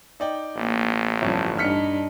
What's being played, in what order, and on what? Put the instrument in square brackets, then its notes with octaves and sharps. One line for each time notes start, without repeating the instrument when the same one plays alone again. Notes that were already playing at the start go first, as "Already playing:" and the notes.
[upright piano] D#4 D5 G5
[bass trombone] A1 [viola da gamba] A#3
[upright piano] G1 F2 [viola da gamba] G3 C#4
[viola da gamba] G2 D4 D#4 [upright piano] F6 B6 C#7